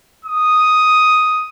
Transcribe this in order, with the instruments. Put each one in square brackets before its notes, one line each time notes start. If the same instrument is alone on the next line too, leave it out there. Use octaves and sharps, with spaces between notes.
[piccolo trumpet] D#6